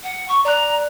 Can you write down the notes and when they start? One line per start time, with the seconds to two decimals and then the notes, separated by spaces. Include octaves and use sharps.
0.03 F#5
0.29 C#6
0.45 D5 A#5 F#6